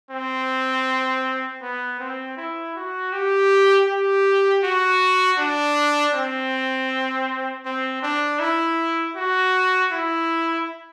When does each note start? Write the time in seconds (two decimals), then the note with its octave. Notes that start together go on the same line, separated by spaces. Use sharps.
0.11 C4
1.62 B3
2.00 C4
2.37 E4
2.76 F#4
3.12 G4
3.88 G4
4.64 F#4
5.39 D4
6.14 C4
7.66 C4
8.02 D4
8.40 E4
9.16 F#4
9.92 E4